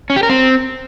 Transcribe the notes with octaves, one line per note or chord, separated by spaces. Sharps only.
C#4
G4
A#4
C4